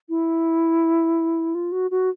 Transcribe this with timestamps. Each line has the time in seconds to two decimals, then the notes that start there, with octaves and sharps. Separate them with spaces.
0.09 E4
1.55 F4
1.72 F#4
1.91 F#4